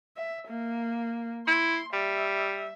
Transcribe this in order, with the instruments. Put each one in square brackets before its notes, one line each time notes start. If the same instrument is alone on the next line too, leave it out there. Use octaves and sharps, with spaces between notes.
[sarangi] E5
A#3
[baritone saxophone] E4 [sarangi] C6
[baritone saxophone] G3 [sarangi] E5